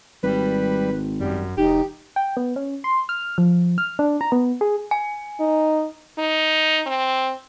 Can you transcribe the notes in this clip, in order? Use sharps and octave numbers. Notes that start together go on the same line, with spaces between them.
G#1 G3 B4
F#2 G3
E1 D#4 G4
G5
B3
C#4
C6
F6
F3
F6
D4
A#5
B3
G#4
G#5
D#4
D#4
C4